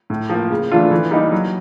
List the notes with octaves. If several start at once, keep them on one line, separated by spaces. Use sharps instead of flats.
A2
F3 A#3
C#3
E3 A3 D4 F4
E3
G3 A#3 D#4
F#3